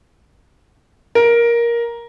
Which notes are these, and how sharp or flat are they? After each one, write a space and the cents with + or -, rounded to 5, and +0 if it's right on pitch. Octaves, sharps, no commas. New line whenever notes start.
A#4 +10